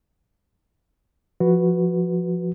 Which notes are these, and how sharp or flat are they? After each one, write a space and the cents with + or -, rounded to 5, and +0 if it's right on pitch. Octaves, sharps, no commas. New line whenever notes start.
F3 +0 F#4 -5 B4 +0